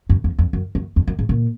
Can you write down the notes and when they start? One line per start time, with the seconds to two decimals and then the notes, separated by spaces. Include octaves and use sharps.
0.09 F#2
0.24 F2
0.39 F2
0.53 F#2
0.75 F#2
0.96 F2
1.07 F#2
1.19 G#2
1.29 A#2